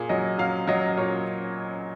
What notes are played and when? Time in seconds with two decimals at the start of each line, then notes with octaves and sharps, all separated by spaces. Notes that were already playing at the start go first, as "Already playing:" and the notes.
Already playing: A#2 G#4
0.09 F#3 D#5
0.38 F#3 F5
0.67 F#3 D#5
0.97 A#2 C#5